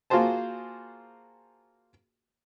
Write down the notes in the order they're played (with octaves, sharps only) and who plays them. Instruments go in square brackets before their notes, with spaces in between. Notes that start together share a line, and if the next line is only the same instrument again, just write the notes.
[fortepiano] A#3 F4 F#4 G#4 C5 A5